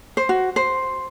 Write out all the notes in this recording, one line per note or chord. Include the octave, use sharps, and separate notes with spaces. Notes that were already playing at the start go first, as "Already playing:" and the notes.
C5
F#4
C5